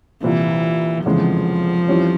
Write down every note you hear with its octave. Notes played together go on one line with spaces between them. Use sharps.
C2 A#2 E3 F3
F1 E2 C#3 E3 F3 G#3
F2 E3 G3 C#4